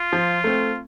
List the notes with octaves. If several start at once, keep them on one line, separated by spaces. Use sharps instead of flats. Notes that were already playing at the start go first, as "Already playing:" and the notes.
Already playing: F4
F3
A3 C4